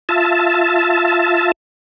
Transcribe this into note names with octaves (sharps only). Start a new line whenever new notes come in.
F4 E5 A5